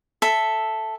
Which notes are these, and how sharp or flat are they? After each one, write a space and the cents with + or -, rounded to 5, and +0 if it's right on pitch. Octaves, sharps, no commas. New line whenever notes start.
A4 +0 E5 +0